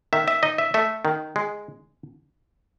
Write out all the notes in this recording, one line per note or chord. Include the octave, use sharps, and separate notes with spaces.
D#3 E5
E5
D#4 D#5
E5
A3 E5
D#3
G#3